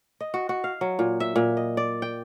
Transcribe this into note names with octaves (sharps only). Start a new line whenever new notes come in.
D#5
F#4
F#4
F5
F#3
A#2
E5
A#2
D#5
D5
G5